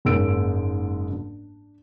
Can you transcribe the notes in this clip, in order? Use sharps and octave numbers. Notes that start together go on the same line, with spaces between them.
F#1 G#2 A#3 E6 D7
D4